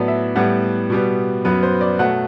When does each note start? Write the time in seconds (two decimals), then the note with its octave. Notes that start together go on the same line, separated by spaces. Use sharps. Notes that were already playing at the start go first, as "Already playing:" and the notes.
Already playing: A2 F#3 B3 D5
0.08 E5
0.36 A2 G3 B3 F#5
0.90 B2 G3 B3
1.45 F#2 F#3 B3 B4
1.63 C5
1.81 D5
1.99 B2 F#3 A3 F#5